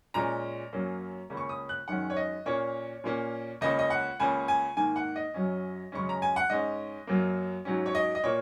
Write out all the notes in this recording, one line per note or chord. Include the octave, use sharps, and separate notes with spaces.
A#2 G#3 C#4 A#5
F#2 F#3 A#3 C#4
C#2 C#3 A#3 C#4
C#6
D#6
F#6
F#2 D#3 G#3 C#4 F#5
C#5
D#5
A#2 A#3 C#4 C#5
A#2 A#3 C#4
C#2 C#3 A#3 C#4 D#5
D#5
F#5
C#2 C#3 A#3 C#4 G#5
G#5
G#2 D#3 A#3 G#5
F#5
D#5
F#2 F#3 C#4
F#2 C#3 G#3 C#4 C#6
A#5
G#5
F#5
G#2 G#3 C#4 D#5
F#2 F#3 A#3
G#2 F#3 C#4
C#5
D#5
D#5
A#2 A#3 C#5